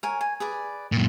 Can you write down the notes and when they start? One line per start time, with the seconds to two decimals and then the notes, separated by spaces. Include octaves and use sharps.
0.03 A#4 C#5 G#5
0.21 G#5
0.40 G#4 B4 D5
0.92 F#2 A#2